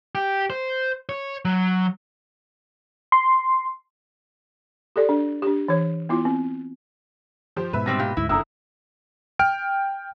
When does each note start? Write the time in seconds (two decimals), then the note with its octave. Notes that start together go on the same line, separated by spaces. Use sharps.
0.15 G4
0.50 C5
1.09 C#5
1.45 F#3
3.12 C6
4.96 G4 A4 D5
5.09 D4
5.42 D4 G4
5.68 E3 C#5
6.09 B3 E4 F4
6.25 C4
7.56 F3 G4 C5
7.73 G#2 B2 B4 E5
7.86 C3 G3 C4 A#6
7.99 A#2 G4
8.17 D2 G#2 E4
8.29 F#1 C2 D3 E4 A#5 D#6 E6
9.39 G5 F6 D7